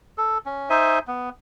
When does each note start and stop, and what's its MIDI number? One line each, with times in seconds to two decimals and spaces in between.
0.18 0.38 69
0.46 0.69 61
0.70 0.99 63
0.70 0.99 72
0.70 0.99 76
0.70 0.99 80
1.08 1.29 59